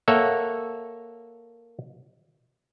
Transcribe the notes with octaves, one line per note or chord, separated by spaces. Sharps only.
A#3 A4 C#5 E5 F#5